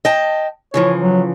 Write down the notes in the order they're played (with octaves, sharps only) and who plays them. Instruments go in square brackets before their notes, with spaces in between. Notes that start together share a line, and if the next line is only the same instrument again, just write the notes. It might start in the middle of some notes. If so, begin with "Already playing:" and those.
[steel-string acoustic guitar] D#5 G5 A5
[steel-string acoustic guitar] C#3 E3 F3 [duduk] C#5
[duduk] F#3